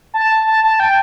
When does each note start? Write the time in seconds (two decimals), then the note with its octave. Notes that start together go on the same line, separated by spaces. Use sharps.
0.14 A5
0.47 A5
0.63 A5
0.80 G5